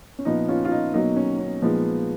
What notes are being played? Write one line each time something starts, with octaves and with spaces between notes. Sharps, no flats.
C#4
A#2 F3 B3 D#4
C#4 F4
F4
D#4
B2 F#3 A#3 D#4
C#4
C#4
A#2 F3 G#3 B3 D#4